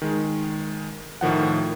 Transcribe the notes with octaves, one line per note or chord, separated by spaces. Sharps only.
D#3 G#3
A2 D#3 F3 F#5